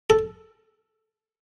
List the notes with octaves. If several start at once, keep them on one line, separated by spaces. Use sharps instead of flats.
A4